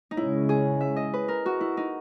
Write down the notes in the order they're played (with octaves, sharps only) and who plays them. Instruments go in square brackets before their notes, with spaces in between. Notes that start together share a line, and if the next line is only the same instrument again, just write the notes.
[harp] D#4
[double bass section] C#3 G#3 C#4 [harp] E4
[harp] G#4
E5
D#5
B4
A#4
F#4
E4
D#4